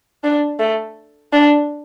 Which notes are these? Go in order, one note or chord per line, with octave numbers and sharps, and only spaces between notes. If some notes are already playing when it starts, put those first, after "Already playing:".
D4
A3
D4